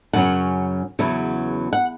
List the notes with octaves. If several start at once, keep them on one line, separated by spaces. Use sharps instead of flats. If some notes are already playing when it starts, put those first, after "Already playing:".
F#2 C#3 F#3 C#4 F#5
E2 C#3 F#3 B3 E4
F#5